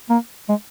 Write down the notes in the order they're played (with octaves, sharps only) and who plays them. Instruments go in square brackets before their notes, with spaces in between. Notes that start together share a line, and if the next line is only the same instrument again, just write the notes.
[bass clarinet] A#3
G#3